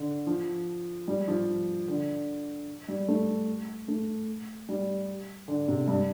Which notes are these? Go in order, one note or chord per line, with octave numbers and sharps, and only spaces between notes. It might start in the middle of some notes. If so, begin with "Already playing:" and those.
Already playing: D3
F3
G3
F3
D3
G3
A3
A3
G3
D3
C3
G2